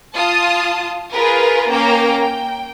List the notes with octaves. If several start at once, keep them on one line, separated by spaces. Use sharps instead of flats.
F4 A5 D#6
F4 G#4 A#4 B4
A#3 C#4 G5 A#5 D6
G5